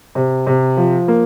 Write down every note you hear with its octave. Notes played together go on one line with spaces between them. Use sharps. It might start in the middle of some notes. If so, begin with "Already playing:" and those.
C3
C3
F3
A#3